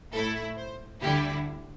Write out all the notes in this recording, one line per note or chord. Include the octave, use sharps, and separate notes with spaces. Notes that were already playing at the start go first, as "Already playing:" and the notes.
A2 A3 E4 A4
C5
D2 D3 G3 E4 G4